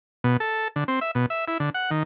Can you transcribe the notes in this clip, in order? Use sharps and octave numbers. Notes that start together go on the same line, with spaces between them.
B2
A4
D3
C4
E5
B2
E5
E4
D3
F#5
D#3